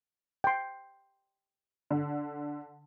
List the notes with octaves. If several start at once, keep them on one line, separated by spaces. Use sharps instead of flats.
G5 C6
D3